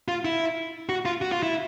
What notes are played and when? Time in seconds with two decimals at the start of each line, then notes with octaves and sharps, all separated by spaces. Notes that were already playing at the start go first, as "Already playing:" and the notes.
0.08 F4
0.25 E4
0.89 F#4
1.05 F4
1.22 F#4
1.32 F4
1.43 E4